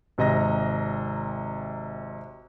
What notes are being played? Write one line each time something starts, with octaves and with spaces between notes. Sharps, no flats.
G#1 C3 D#5 A#5 A#6